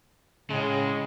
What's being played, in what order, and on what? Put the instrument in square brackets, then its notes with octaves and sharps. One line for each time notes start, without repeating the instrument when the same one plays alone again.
[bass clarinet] A2 [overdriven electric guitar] C#3 [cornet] G#3